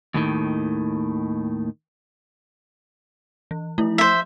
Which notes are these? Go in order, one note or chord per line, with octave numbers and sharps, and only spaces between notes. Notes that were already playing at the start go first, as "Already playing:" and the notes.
D#2 A2 D#3
E3
F3 A3 E4
A3 C5 E5